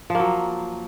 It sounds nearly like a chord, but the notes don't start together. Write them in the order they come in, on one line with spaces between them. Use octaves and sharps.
F3 A#3 F#3